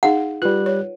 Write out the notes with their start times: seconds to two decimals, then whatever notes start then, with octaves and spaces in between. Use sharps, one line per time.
0.03 D#4 G#4 F5 F#5
0.42 G3 F4 B4 F#6
0.66 C#5